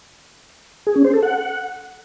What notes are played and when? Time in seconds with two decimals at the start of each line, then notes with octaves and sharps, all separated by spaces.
0.87 G#4
0.96 C#4
1.05 C5
1.14 A4
1.22 F#5